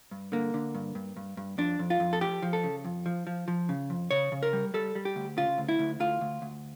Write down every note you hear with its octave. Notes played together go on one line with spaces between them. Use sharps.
G2
D3 A#3
D3
G2
G2
G2
G2
F2 D4
F2
F4
F2
A4
F3 G4
F3
A4
C#3
F2
F3
F3
F3
C#3
F2
C#3 C#5
C#3
A#4
G3
G3 A4
G3
G4
D2
C#3 F4
D2
E4
D2
D2 F4
D2
D2